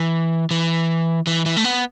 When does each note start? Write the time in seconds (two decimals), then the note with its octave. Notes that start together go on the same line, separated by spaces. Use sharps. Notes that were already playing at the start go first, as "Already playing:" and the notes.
Already playing: E3
0.51 E3
1.27 E3
1.46 E3
1.57 A3
1.64 B3